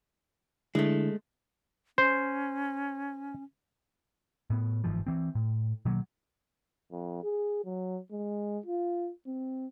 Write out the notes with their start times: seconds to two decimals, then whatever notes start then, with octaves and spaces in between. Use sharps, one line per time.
0.75 D3 G#3 A3 D4 E4
1.98 C#4 C5
4.50 A2 B3
4.84 G1 G#2 E3 F3
5.07 E3 C4
5.35 A2
5.85 B2 D#3 F#3 A#3
6.92 F2
7.23 G#4
7.65 F#3
8.12 G#3
8.66 F4
9.27 C4